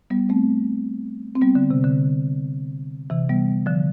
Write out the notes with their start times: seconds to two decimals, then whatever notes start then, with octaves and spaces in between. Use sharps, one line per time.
0.10 G3 B3
0.29 A3 C4
1.35 C4
1.41 G3 B3
1.55 D3
1.71 C3
1.84 D3
3.10 C3 E3
3.29 G3 B3
3.66 D3 F3